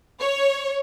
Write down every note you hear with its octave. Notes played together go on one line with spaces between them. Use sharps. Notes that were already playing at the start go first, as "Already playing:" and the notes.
C#5